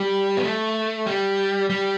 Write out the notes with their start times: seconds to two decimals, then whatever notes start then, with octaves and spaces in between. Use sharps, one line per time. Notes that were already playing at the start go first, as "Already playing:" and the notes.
Already playing: G3
0.37 B3
0.43 A3
1.06 G3
1.70 G3